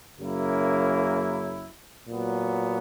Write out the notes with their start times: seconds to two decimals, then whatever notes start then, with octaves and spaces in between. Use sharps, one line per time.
0.19 F#2 C#3 F#3 A#3 E4
2.07 A#2 F#3 B3